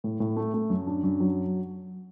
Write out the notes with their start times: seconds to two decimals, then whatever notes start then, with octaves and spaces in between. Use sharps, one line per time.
0.04 A2
0.20 A2
0.37 A3
0.54 A3
0.70 F#2
0.87 D4
1.03 F#2
1.20 F#3